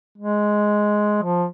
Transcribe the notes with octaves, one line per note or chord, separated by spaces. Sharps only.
G#3
F3